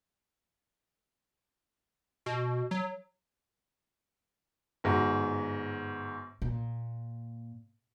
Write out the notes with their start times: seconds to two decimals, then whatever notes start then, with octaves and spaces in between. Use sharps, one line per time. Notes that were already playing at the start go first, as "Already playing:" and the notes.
2.26 B2
2.71 F#3
4.84 G1 G#2 F#4
6.42 A#2